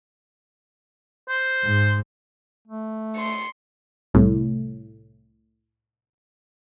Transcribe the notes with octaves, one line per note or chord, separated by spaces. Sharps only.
C5
G#2
A3
C6 C#7
C2 A2